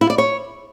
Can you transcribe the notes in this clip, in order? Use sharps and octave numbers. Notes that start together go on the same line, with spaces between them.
E4
D5
C#5